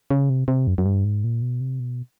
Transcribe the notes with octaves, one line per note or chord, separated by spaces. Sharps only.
C#3
C3
C3
F#2
F#2
G2
G#2
A#2
B2
C3
B2